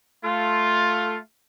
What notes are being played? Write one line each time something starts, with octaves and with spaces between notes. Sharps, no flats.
A3 F4